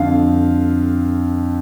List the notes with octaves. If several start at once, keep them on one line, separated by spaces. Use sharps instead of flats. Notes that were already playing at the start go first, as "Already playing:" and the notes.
Already playing: F2 D3 F5